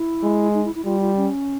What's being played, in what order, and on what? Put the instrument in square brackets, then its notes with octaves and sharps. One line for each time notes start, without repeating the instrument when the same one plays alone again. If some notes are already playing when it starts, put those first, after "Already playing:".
Already playing: [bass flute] E4
[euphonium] G#3
[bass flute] D#4
E4
E4
[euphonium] G3 [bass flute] F4
[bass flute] F4
C#4